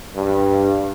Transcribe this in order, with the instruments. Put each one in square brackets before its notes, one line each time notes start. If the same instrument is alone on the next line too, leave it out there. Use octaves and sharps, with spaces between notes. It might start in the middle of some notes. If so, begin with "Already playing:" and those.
[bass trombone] G2